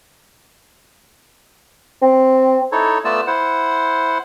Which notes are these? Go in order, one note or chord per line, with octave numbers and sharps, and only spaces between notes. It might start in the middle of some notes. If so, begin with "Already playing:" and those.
C4
D#4 E4 A4 C#5
A3 B3 F4 D5 A5 E6
E4 C5 F#5